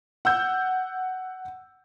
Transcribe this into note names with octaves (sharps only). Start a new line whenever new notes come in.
F#5 E6 G6